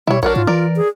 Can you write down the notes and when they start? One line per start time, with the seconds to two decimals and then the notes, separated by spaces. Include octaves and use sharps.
0.07 B2 G3 E4 C#5
0.23 A#1 D4 F#4 A#4 C#5
0.36 G#2 F4
0.47 E3 A#4 D5
0.76 G#4